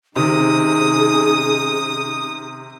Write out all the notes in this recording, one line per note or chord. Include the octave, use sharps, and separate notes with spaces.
C3 D#3 C#4 D#4 G#4 D#6